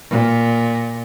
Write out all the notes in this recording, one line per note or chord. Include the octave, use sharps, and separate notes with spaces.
A#2